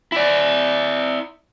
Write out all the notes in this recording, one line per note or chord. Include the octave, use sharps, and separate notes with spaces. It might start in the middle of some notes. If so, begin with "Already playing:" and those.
E4 D5